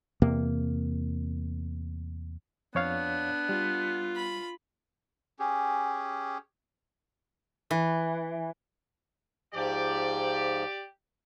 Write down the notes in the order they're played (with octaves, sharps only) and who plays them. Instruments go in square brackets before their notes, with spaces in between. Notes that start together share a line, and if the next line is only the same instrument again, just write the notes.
[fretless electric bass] E2 C3 A#3
[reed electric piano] F2 C#5 F5 [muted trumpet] B3 [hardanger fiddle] D4
[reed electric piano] G3 [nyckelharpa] F4
[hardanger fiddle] B5
[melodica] C#4 G4 G#4
[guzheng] E3
[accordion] G#2 F3 [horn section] G4 D5